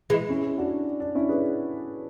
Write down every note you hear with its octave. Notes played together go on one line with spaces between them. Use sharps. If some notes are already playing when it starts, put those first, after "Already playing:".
E3 G#3
C#4 E4
D4 F#4
D4
C#4 E4
G#4 B4